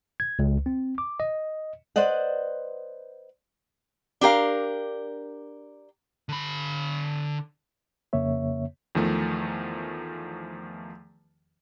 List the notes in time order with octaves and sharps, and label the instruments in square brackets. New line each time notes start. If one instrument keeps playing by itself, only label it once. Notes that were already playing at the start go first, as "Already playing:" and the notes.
[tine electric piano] G#6
C#2
C4
D6
D#5
[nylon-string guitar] B4 C5 D5 D#5 F#5
[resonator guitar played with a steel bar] D4 G4 A#4 F5
[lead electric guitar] D3 B5
[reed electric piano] F2 C#3 A#3 C#5 E5
[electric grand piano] E2 D#3 F3 A3